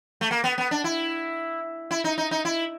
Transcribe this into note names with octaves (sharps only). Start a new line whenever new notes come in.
A3
A#3
B3
B3
D4
E4
E4
D#4
D#4
D#4
E4